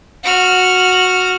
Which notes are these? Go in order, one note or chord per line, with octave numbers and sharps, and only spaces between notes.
F#4 F6